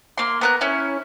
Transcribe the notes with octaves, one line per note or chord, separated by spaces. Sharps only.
A#3 C6
B3 A#4 F#6
C#4 E4